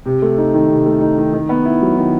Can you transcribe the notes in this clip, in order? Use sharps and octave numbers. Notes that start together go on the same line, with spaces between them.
C3
A3
D#4
D#3
C3
A3
D#4
D#3
D#3
B3
E4
F#3
D#3